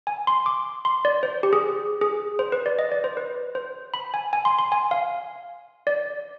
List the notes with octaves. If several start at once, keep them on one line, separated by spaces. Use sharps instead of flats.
G#5
C6
D6
C6
D5
C5
G4
G#4
G#4
C5
B4
D5
D#5
D5
C5
B4
C5
B5
G#5
G#5
C6
C6
G#5
F5
D5